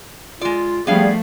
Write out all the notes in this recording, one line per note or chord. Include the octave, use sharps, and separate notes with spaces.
G#3 F4 D5
F3 G3 A3 B3 D4 G#4 F5